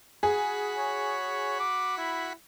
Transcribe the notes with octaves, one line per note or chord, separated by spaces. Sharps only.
F#4 G#4 B5
C#5
D6
E4